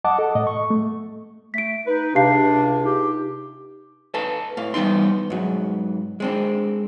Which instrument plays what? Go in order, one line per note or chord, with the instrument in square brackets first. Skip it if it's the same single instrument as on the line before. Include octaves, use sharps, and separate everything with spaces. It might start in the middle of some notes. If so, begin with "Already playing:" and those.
[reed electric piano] D#5 F#5 A5 D6
A4
A2 D#5
C#6
A3
[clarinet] A3 [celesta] B6 D7
[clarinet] D#4 [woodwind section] B4
[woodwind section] C#2 C3 [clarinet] D4 [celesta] G4 F5 C7
[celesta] D#4 [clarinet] G4
[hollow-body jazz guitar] A4 B4 F5 A5
A2 F5
E3 G3 B3 D#4 C6
G#2 F#3
G#3 C4 D4